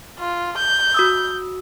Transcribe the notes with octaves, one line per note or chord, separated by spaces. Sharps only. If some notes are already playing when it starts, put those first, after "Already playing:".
F4
G6
F#4 D#6 E6